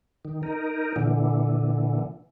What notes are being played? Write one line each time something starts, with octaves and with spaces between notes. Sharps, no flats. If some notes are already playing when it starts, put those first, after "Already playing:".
D#3
D#4 A#4
A#2 D3 E3